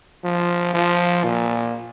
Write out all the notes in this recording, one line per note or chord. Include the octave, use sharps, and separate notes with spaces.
F3
F3
A#2